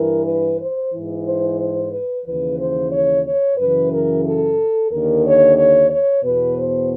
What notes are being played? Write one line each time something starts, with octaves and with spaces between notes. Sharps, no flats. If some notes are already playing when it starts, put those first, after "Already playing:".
Already playing: G2 E3 A#4
B4
C5
G#2 E3
C5
C5
B4
D#2 C#3 E3 B4
C5
C#5
C#5
F#2 C#3 E3 B4
A#4
A4
D#2 D3 A#4
C#5
C#5
C#5
E2 B2 B4
C5